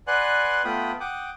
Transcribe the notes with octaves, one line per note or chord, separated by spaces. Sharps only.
B4 D5 F#5 G#5 C6 F#6
A3 B3 F4 G5 B5 D#6
F#5 G5 D6 D#6